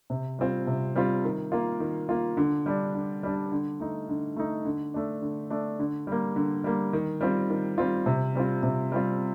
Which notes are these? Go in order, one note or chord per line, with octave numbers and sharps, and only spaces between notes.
C3
G3 C4 F4
C3
G3 C4 F4
D#3
A#3 F4
D#3
A#3 F4
D3
G3 D4
D3
G3 D4
D3
A3 D#4
D3
A3 D#4
D3
A3 D4
D3
A3 D4
D3
G3 A#3
D3
G3 A#3
D#3
G3 C4 F4
D#3
G3 C4 F4
C3
G3 C4 F4
C3
G3 C4 F4